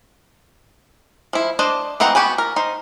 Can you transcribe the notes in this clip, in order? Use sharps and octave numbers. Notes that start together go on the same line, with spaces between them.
F3 E4
D4 C5 D5 D#5
E3 C4 D#4 F#5 A#5
B3 F#4 G4 B4 G#5
A#4
D#4 C5